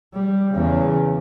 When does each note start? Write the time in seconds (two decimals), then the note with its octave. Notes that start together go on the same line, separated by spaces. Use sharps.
0.13 G3
0.53 E2 C#3